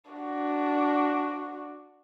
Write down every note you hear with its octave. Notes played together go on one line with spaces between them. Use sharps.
D4 F#4